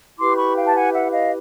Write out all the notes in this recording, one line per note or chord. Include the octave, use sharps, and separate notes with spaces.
E4 G4 B4 C6 D6
B5 C#6
F5 G5
A5
F#5 G#5
E5 F#5
D#5 F5